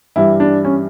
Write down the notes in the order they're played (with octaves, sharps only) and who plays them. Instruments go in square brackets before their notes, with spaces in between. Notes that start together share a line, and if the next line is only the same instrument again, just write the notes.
[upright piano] G2 E3 G3 E4
D4
C#4